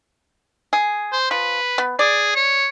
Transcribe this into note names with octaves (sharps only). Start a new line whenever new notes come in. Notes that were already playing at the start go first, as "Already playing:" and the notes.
G#4
C5
F3 B4
B3
G#4 D5
C#5